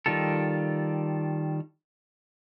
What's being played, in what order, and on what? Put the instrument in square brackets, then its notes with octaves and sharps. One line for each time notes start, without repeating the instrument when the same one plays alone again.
[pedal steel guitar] D#3 G3 F4 A4